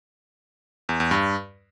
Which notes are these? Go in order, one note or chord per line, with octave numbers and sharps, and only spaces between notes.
E2
E2
G2